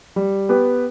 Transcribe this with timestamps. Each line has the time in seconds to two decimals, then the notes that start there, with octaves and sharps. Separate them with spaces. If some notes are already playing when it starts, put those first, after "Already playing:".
0.16 G3
0.49 B3 G4 B4